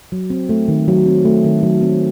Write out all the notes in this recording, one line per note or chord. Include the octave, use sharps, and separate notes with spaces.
F#3
C4
A3
D#3
F#3
C4
A3
D#3
F#3
C4